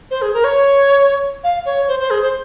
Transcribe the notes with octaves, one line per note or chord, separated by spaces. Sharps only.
C5
G#4
A#4
C#5
F5
C#5
C5
C5
G#4
C5